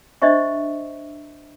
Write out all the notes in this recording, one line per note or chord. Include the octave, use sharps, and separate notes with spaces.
D4 C5 D#5 E5 C#6